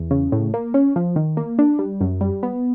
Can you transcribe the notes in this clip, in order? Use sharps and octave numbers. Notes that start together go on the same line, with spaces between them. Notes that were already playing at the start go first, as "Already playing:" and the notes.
Already playing: E2
C#3
A2
A#3
C#4
F3
D#3
A#3
D4
G3
F#2
G3
B3